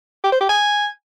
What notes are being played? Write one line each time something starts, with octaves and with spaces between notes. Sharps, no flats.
G4
C5
G4
G#5